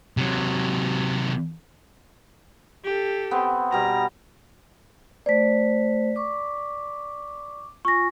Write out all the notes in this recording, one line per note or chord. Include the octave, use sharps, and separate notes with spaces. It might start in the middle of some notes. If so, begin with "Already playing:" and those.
C3 F#3
G4 A4
B3 C4
B2 G3 A#5
A3 C5 D5 B6
C#6 D6
F4 G#5 C#6 A#6